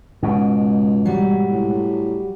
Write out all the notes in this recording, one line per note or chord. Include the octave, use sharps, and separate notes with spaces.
C#2 G#2 B2
F#3 G3
A2